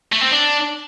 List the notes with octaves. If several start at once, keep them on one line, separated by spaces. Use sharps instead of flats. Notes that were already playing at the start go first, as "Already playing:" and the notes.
A3
C4
D4